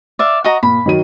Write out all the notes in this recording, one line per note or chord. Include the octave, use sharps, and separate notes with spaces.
D5 E5 F5
F#4 D#5 A#5
A#2 B5
D#3 F#3 D#7